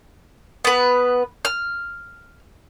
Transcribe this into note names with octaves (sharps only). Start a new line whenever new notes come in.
B3 B4
F6